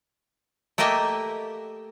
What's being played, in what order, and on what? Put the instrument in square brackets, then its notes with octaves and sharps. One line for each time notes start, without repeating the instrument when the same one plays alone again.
[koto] A3 A#3 G4 D#5 E5 G5